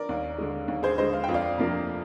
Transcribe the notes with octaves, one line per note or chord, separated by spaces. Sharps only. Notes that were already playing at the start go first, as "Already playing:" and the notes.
Already playing: A#4 D5
D#2
D3 G#3
D#2
G#4 C5
D3 G#3 C5 D#5
F5
F2 G5
D5 F5
C3 F3 A#3